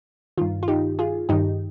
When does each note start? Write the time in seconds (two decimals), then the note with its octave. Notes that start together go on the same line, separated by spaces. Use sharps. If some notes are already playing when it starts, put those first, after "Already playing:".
0.37 G2 D#3 F4
0.63 F4
0.68 D#4 G4
0.99 F4 G#4
1.29 G2 D#3 D#4 G4